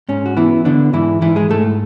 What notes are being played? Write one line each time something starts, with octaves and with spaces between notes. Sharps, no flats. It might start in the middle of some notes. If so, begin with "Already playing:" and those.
G#2 C#4
F#4
E3 B3 E4
D3 B3 D4
G#2 E3 E4
G#2 E3 E4
G#3 G#4
G#2 A3 A4